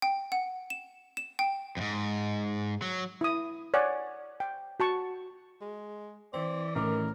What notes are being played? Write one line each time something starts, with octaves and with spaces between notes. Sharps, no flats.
G5
F#5
E7
E7
G5
F2 G#2
F#3
E4 D#6
C#5 D5 F#5 G#5
G5
F#4 A5 C#6
G#3
E3 C4 D5
A2 D#3 C#4 A#4 D6